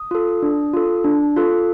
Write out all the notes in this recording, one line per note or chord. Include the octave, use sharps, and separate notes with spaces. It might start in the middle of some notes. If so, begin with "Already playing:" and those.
Already playing: D#6
F4 A4
D4
F4 A4
D4
F4 A4